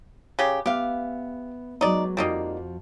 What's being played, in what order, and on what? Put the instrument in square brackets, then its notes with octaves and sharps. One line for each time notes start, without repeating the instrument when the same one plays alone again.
[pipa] C#3 G4
[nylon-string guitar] B3 B4 E5 [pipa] G4 F5
[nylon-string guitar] F#3 G#3 B3 [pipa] D#4 D5
[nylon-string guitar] F2 F3 F#4 [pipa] G3 A#3 D#4